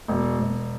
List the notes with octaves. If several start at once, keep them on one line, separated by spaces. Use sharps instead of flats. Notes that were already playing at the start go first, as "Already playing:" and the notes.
E1
E1